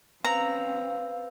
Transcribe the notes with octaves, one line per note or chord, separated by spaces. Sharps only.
C4 C#4 B4 C5 F5 A#5 E6